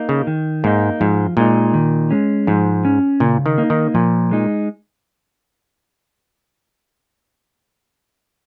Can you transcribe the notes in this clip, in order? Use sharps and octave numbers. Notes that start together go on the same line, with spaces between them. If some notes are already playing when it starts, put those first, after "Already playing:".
Already playing: A#3 D#4
C#3
D#3
G#2 A#3 D#4
G#2 F3
A#2 G#3 D#4
D#3
G#3 C#4
G#2 F3
C#4
A#2 C#3
D#3
A#3 D#4
D#3
A#2 F3
G#3 D#4